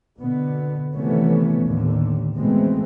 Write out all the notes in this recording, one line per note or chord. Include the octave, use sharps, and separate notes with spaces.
B2 D3 B3
C3 D#3 E3 A3 B3 C#4
D#2 A2 D3
B2 E3 G#3 A3 B3 C4